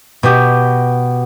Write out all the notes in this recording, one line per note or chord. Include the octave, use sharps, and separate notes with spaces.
B2 B3 G4